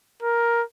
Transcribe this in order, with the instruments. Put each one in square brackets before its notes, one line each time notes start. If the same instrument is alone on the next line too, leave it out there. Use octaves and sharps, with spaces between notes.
[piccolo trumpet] A#4